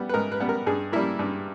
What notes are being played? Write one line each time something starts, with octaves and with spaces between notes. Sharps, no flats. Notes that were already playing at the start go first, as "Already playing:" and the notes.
Already playing: G3 B3
B4
G#2 A#4
B4
G3 B3
A#4
G2 G#4
G3 A#3 E4
G2